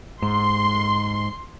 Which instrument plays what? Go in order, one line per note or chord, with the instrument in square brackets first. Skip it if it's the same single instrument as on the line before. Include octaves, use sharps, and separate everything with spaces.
[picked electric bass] G#2 [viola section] C6